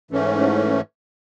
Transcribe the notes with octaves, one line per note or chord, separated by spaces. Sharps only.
G#2 E3 A3 C#4